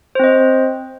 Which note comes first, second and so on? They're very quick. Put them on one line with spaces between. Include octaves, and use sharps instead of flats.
C5 C4 D#5